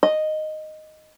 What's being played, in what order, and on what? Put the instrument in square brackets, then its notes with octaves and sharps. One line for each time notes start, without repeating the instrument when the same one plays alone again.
[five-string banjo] D#5